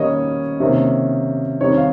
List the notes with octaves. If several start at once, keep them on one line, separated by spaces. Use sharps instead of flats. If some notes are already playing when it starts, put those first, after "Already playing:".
Already playing: D#3 G3 A#3 C#4 C#5 D#5
C3 D#3 A#3 C#4
D#3 G3 C4 D#4 C#5
F5